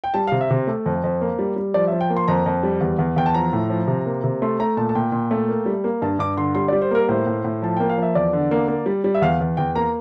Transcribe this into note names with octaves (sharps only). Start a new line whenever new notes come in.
G5
G3 A5
F5
C3
E5
C3
A3
F2
F2
A#3
G3
G3
F3 D5
F3 E5
G5
A#3
C6
F2 A#5
F2
G3
E2
E2
E2 G5
A5
F3 A#5
A2
F3
C3
A#3
C3
A3 C6
A3 A#5
A#2 A5
A5
A#2 G5
A#2
A3
A#3
G3
A#3
G2 A5
G2 D6
D3 C6
G3 C6
G3 D5
C5
A#3 A#4
A2 C5
A2
A2
F3 A5
A#3 G5
F5
F3 E5
E2 D5
D3
A#3
A#3
G3
G3
E5
E2 F5
E2
E2 G5
A#3 A#5